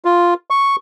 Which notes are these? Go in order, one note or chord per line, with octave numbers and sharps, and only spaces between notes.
F4
C#6